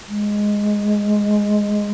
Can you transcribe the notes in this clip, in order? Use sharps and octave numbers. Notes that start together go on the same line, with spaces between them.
G#3